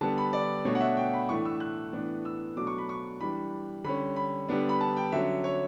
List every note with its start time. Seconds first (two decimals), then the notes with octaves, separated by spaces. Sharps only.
0.01 D3 G3 B3 A5
0.18 B5
0.33 D5
0.65 B2 A3 D4 C#5
0.75 F#5
0.81 E5
0.97 G5
1.14 B5
1.29 A2 E3 A3 D4 C#6
1.45 E6
1.60 F#6
1.93 A2 E3 B3 D4
2.25 E6
2.57 B2 F#3 A3 D4 D6
2.67 C#6
2.78 B5
2.89 C#6
3.20 E3 G3 D4 B5
3.84 D3 G3 C#4 B5
4.16 B5
4.48 D3 G3 B3 D4
4.69 B5
4.81 A5
4.97 G5
5.12 D3 F#3 C#4 E5
5.44 C#5